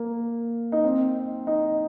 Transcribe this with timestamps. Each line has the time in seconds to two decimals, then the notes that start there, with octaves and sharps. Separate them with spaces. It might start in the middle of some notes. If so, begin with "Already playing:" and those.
Already playing: A#3
0.72 D#4
0.84 C4
1.47 D#4